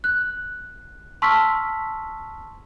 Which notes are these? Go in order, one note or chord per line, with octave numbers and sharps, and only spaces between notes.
F#6
A5 C6 C#6 E6 F6 B6